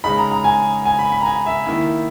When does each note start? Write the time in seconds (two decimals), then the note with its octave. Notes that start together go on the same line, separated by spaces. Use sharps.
0.04 C#3 G#3 D#4 B5
0.17 A#5
0.31 A#5
0.44 G#5
0.86 G#5
0.99 B5
1.12 B5
1.21 A#5
1.26 G#5
1.46 E5
1.66 D#3 A#3 E4